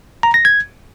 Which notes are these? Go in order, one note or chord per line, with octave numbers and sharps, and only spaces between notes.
A#5
A#6
G#6